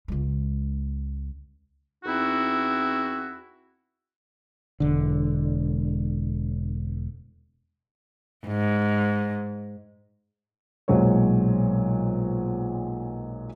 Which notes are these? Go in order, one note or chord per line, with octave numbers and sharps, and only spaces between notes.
C#2 G#3
E2 C4 D#4 E4 F#4
E1 D3
G#2
B1 A#2 F#3 G#3 C5 C#5